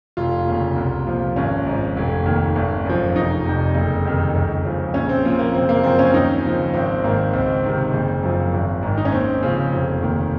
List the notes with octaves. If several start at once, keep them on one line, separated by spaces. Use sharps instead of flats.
F1 F4
D#2 C#3
C2
A#2 F3
G#1 C#4
G#2 F3
F1
D#2 D#3
G#1
F#2 F3
F1 D#4
F2 C3
F#1
F2 C3 D#3
C#2
C#3 F3
A#1 C#4
C4
A#2 F3 C4
A#3
F#1 C4
A#3
F#2 F3 C4
C#4
D#2 D#4
C#3 F3
G#1 C4
G#2 D#3 A#3
C#2 C4
C3 D#3
F#1
F#2 F3
G#1
G#2 D#3
D#4
C#4
D#2 C4
C#3 F3
F1
D#2 D#3